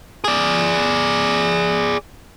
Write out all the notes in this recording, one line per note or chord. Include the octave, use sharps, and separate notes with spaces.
G#4 D5